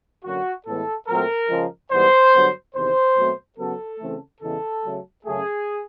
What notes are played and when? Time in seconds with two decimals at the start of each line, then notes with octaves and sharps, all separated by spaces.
0.24 F#2 D3 F#3 A#3 F#4
0.66 A2 E3 G#3 B3 A4
1.08 A#2 F#3 A3 C4 A#4
1.49 C#3 F3 G#3
1.92 G#2 E3 G3 B3 C5
2.33 G2 D3 F#3 B3
2.75 E2 C3 D#3 C5
3.17 B2 F#3 A3 C4
3.58 C#3 F#3 B3 A4
4.00 C#3 E3 A3 C4
4.41 E2 C#3 E3 G#3 B3 A4
4.83 C#3 F#3 A3
5.25 F#2 C#3 F#3 A3 G#4